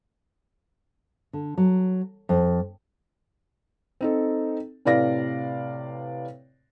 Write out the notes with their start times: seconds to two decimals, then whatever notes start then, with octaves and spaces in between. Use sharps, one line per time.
1.33 D3
1.58 F#3
2.29 F2
4.01 C4 D#4 A4
4.85 A2 C3 B4 D5 F5 A#6